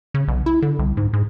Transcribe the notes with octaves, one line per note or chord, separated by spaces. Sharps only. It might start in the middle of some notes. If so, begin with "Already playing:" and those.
C#3
B1
E4
D3
C2
G#2
G#2